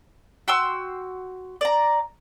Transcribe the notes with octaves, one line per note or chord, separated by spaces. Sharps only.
F#4 G5 C6 E6
D5 A#5